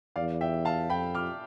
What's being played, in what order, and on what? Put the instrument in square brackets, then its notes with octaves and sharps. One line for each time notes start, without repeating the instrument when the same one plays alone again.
[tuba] E2 [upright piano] D5 F5
[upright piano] E5 G5
F5 A5
[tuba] F2 [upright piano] G5 B5
[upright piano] D6 F6